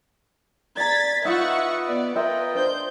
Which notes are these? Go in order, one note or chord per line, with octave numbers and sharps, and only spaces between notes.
D5 A#5 G#6 A6 B6
D#4 F4 B4 D#5 E5 F#5 C#6 E6
B3 D5
F4 A#4 B4 D#5 E5 G5
D4 C5 G6